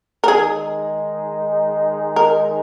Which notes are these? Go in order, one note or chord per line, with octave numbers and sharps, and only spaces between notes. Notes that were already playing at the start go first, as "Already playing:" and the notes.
A#4
D#3 G#3 D#4 G#4
A#4